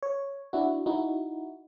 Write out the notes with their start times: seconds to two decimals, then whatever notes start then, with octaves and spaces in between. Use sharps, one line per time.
0.03 C#5
0.53 D4 E4 F#4
0.86 D#4 E4 F#4